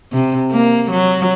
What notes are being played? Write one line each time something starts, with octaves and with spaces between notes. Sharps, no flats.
C3
A#3
F#3